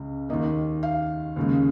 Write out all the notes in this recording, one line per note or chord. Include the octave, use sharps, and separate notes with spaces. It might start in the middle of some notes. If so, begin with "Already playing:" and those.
Already playing: C#2 C#3
D#2 D#3 A#3 D#5
F5
D#2 C#3 G#3